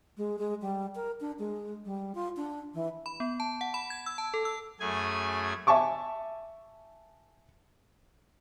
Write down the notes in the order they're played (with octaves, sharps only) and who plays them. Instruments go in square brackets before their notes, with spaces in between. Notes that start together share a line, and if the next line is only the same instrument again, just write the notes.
[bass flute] G#3
G#3
G3
A#4
D4
G#3
G3
F4
D4
E3
[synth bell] B5
B3
A5
F#5
B5
G#6
E6
A5
A4
E6
[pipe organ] F#2 A3 G#4 G#5 G#6
[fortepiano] E5 G#5 A5 C#6 D6